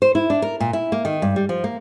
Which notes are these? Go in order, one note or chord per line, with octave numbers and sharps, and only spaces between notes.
C5
E4
D4
A#4
A#2
E4
A#3
D#3
G2
G3
F3
A#3